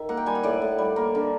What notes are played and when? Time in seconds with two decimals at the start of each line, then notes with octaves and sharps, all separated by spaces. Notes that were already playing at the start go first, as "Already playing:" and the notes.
Already playing: D#3 E5
0.09 A#3 F#5
0.17 G5
0.26 G3 G#5
0.35 F#5
0.43 A2 D5
0.62 A2
0.78 G3
0.96 A#3
1.15 D3